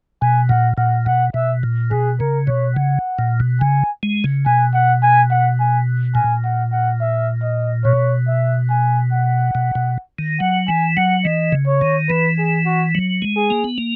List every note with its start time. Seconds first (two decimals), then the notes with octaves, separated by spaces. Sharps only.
0.21 B2 G#5
0.49 A#2 F#5
0.78 A#2 F#5
1.06 B2 F#5
1.34 B2 E5
1.63 A#2
1.91 B2 G#4
2.20 C#3 A#4
2.47 B2 C#5
2.76 C#3 F#5
3.19 A#2
3.40 B2
3.61 C#3 G#5
4.03 G#3
4.24 C#3
4.46 B2 G#5
4.74 F#5
5.03 G#5
5.31 F#5
5.59 G#5
6.15 A#2 G#5
6.44 F#5
6.72 F#5
7.01 E5
7.42 D#5
7.85 B2 C#5
8.28 E5
8.70 G#5
9.12 F#5
9.55 B2
9.75 B2
10.19 D#3
10.40 F#3 F#5
10.67 E3 G#5
10.97 F#3 F#5
11.24 E3 D#5
11.52 C#3
11.67 C#5
11.81 D#3
12.09 E3 B4
12.38 G#4
12.66 F#4
12.95 F#3
13.22 G#3
13.37 G#4
13.50 A#3
13.64 B3
13.78 A#3